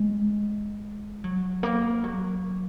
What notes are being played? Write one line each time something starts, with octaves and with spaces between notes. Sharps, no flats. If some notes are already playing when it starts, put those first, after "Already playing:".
Already playing: G#3
F#3
A#3
F#3